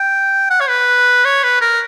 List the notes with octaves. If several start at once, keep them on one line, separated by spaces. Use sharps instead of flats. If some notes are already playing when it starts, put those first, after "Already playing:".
Already playing: G5
F#5
C#5
B4
C#5
B4
A#4